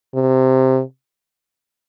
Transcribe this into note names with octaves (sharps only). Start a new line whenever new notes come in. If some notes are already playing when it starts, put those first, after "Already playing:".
C3